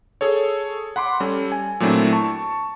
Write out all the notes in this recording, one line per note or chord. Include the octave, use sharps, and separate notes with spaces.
G#4 A4 C#5
F#5 B5 C6 D6
G3 C#4 A4
G#5
A#2 F#3 A3 C4 D4 E4
A5 C#6